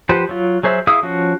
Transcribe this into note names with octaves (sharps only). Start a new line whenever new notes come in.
F3 G4 B4 C5 F#5
F#3 F4
F#3 G#4 C5 E5
E4 G#4 F5 D#6 E6
F3 C#4 F#4